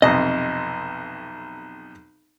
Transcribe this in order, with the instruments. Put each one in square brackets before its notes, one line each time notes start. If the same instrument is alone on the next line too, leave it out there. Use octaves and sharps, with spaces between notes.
[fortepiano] B1 F2 C3 [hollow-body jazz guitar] D#5